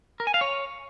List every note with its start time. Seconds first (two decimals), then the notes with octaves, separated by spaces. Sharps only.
0.20 A#4
0.27 G#5
0.34 F5
0.41 C#5